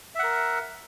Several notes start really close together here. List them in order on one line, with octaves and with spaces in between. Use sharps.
E5 F#5 A#4